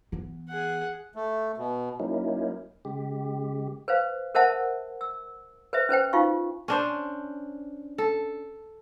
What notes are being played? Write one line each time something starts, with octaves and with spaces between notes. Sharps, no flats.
E3 B3
G#4 F#5
A3
B2
F#3 A#3 C#4 D#4 E4
C#3 G#3 G4
B4 C5 F5
A#4 C5 E5 F#5 A5
E6
B4 C5 E5
C#4 B4 C5 G5
D#4 F4 F5 C#6
C#4 D4 C5
A4